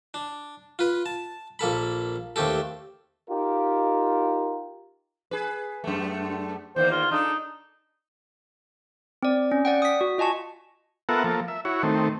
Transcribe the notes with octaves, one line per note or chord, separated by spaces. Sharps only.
D4
F4 B4
A5
A#1 A#3 A4 B5
D#2 A3 C4 G4 A4
D#4 F4 G4 A#4
G#4 B4
F#2 A3
E2 D#3 A#3 C5
F4
D4 D#4 A4
C4 D5
C#4
D5 F#5 G5
D#6 B6
F#4
F4 D#5 G#5 A5 C#6
B3 F4 A4 A#4 E5 F#5
F3 A#3 A4
E5
E4 F#4 C#5
D#3 A3 C4